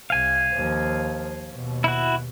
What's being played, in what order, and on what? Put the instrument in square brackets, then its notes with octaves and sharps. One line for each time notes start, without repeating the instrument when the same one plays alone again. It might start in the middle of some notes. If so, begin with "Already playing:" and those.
[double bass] C2 [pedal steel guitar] F5 G#5
[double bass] D#2 F3
D#2 B2
[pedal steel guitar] E4 F#4